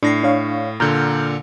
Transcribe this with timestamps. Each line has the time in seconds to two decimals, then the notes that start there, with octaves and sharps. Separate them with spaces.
0.03 A2 D4 A#6 C7
0.23 D4 C#5 F5
0.80 A#2 D3 A#5 F6 G6